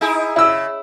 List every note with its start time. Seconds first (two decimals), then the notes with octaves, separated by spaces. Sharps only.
0.01 D#4 E4 G#4
0.36 C#3 E4 E6